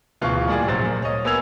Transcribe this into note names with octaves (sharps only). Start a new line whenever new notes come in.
D1 B2 E3 F4 F5 C#6
A#2 G3 G#4 D5
F1 A#1 F#3 C5 A6
A#2
C#5 D#5
A#3 B3 G#5 E6 G#6 F7